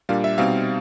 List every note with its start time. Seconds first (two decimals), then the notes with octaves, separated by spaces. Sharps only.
0.09 A#2 G3 A#3 D4 F5
0.24 E5
0.38 B2 G3 C4 D#4 F5